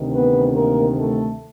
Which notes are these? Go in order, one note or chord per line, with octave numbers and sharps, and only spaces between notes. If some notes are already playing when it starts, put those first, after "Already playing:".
Already playing: D2 C3 D#3
B3 B4
A#3 A#4
A3 A4